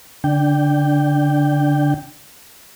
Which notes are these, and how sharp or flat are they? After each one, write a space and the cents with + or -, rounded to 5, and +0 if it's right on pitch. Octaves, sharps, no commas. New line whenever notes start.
D3 -25 D4 +0 G5 +0